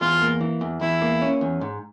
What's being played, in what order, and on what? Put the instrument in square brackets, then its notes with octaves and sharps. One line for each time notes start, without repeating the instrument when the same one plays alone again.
[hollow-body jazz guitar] E2 [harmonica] F4
[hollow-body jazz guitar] A#3
E3
E2
[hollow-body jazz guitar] E2 [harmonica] E4
[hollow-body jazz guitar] A#3
C#4
E2
G#2